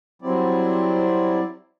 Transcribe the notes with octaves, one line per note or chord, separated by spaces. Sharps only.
F#3 G3 C4 E4 D5